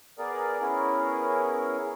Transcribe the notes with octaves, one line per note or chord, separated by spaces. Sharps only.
B3 G#4 A#4 D5
B3 C#4 E4 G#4 A#4